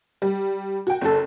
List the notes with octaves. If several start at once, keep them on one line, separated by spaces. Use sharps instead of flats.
G3
F#4 G5
F#1 A4